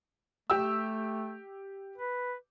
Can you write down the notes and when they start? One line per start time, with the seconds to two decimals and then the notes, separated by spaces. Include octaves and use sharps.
0.50 A3 G4 E6
1.98 B4